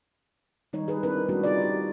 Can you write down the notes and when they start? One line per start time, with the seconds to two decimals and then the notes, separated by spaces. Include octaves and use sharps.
0.73 D#3 G3 D#4 C#5
0.88 G#4 B4
1.03 C4 D4 E4 A#4 B4
1.29 G3 A3 B3 C#4 D4 F#4
1.43 C4 D#4 F4 G#4 C#5 D5
1.61 G4